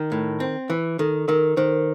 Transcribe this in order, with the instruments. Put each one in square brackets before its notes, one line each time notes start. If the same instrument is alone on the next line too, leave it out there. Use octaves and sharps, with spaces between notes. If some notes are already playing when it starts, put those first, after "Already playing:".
Already playing: [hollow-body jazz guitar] D#3
A2
C4
E3
[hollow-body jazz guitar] D#3 [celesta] A4
[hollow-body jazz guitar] D#3 [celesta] A#4
[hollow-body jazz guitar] D#3 [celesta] C5